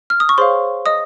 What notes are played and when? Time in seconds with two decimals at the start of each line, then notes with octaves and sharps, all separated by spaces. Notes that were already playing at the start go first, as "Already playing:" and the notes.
0.10 F6
0.20 D#6
0.29 C#6
0.38 G#4 C5 C#5 F5 C6
0.86 D#5 D#6